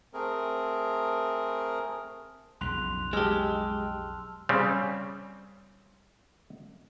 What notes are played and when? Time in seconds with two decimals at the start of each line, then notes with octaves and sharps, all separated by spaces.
0.14 A3 C4 G#4 A#4
2.61 B1 F2 C#3 C6 F#6 F7
3.13 G#3 G4 A5 E6 F6
4.49 C#3 G3 C4